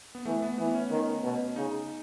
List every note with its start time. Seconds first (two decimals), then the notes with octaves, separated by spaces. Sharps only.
0.15 B3
0.25 E3 A3
0.42 B3
0.58 E3 B3
0.74 C#4
0.90 D#3
1.23 B2
1.56 C#3 D#4